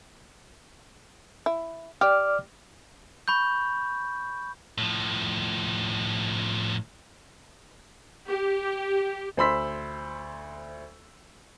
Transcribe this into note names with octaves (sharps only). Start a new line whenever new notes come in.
E4
G4 D5 D6 F6
B5 C#6 G6
A2 F3
G4
D2 C5 B5 C6 E6 B6